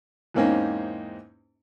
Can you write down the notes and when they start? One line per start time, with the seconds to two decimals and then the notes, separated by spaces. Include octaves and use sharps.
0.34 E2 G#2 A#3 C4 C#4 D#4